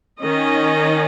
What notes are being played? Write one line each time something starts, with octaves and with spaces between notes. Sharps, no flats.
D#3 C#4 D#5